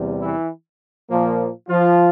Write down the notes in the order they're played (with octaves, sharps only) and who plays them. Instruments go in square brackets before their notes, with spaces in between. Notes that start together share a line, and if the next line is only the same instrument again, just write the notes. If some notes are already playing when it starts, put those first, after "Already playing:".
Already playing: [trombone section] E2 C3 G3
E3 E4
A#2 F3 A#3
F3 F4